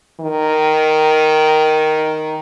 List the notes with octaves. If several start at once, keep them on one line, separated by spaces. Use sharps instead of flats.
D#3